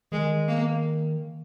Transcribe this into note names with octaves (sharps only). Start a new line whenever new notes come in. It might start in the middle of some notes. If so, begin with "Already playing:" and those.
D#3 G#3
A#3